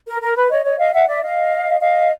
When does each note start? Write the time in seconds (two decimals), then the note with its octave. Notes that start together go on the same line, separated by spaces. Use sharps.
0.07 A#4
0.21 A#4
0.36 B4
0.50 C#5 D#5
0.65 C#5 D#5
0.79 D#5 F5
0.93 E5 F#5
1.08 D5 E5
1.23 D#5 F5
1.80 D#5 F5